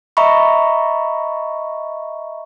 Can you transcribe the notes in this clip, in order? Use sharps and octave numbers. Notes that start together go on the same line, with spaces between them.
D#5 E5 A#5 B5 C#6